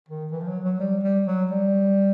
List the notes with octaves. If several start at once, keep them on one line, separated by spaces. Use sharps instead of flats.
D#3
E3
F3
F#3
F#3
G3
G3
F#3
G3